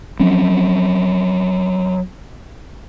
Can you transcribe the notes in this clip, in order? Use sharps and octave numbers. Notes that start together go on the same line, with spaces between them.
F3 F#3 C4 C#4